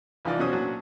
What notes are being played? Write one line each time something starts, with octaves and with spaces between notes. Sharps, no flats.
C2 E3 F3 D#4 F4 D5
B2 F#3 C#4 F#4 C5 D#6
A#2 F#3 C#4 D4 F#4